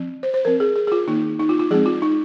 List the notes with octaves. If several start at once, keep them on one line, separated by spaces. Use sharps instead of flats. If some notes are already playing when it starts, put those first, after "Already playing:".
Already playing: F3 C4
C5
C5
F3 C4 A#4
G#4
G#4
G#4
F4
D#3 A#3 D#4
D#4
F4
F4
F3 G#3 C4 G#4
F4
D#4